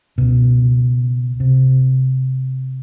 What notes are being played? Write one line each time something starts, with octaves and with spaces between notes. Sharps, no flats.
C#2 B2
C3